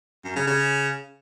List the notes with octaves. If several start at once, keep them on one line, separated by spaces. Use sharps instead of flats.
F#2
C#3
C#3